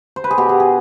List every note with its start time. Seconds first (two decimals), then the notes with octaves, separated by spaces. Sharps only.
0.16 C5
0.24 B4
0.31 G#4
0.38 B2 G4
0.49 G#4
0.60 G#4